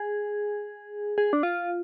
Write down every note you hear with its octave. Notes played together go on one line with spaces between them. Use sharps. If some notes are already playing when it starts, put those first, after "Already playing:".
Already playing: G#4
G#4
D4
F4